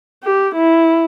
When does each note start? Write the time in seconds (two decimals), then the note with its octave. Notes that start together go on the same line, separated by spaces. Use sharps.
0.24 G4
0.55 E4